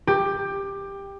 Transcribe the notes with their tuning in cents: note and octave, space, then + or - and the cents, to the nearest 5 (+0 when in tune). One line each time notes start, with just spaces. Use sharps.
G4 +15